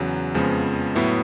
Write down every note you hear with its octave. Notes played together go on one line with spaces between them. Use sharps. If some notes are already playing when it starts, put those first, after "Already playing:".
Already playing: E2 C#3 F#3
F2 C#3 F3 G#3 B3
A2 F#3 B3 E4